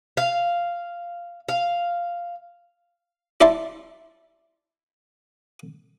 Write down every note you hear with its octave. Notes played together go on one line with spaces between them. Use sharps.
F5
F5
E4 D5 E5 A5 C6